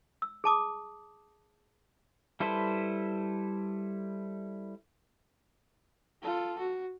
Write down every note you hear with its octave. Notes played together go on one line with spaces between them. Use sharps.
E6
G#4 A5 D6 D#6
G3 E4 A4 B4 C5
F4 A4
F#4